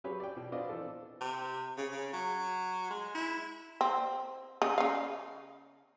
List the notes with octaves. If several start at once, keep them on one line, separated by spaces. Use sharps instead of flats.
F#3 C#4 G4 G#4 B4 C#5
D5 G5
B2
B3 C4 D4 F4 D5 D#5
E3 C4 A4
C3
C#3
C#3
F#3
G#3
E4
C4
C#3 D#5
C#3 F5